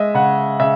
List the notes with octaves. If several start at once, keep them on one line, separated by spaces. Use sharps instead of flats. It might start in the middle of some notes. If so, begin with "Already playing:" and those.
Already playing: G#3 D#5 E5
C#3 F#5
C#3 E5